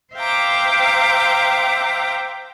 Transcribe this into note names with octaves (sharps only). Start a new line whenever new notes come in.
C5 E5 F5 G5 A#5 D6